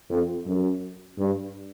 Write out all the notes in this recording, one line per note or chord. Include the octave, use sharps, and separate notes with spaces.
F2
F#2
G2